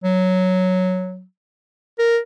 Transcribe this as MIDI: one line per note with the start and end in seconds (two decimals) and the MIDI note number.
0.04 1.24 54
1.99 2.19 70